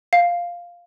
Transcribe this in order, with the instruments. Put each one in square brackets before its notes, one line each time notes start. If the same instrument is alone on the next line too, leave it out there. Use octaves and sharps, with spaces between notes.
[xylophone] F5